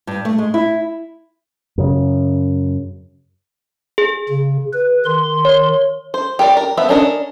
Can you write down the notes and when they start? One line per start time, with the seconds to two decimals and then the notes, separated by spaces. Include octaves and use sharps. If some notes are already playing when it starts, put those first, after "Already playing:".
0.07 G2
0.25 A3
0.38 G#3
0.54 E4
1.78 F#2 C#3
3.98 G#4
4.29 C#3
4.73 B4
5.05 D#3 C6
5.45 C#5
6.14 C5
6.39 G4 A#4 C#5 D5
6.57 A#4
6.77 F3 B3 E5
6.89 C#4 D4 A#4 D#5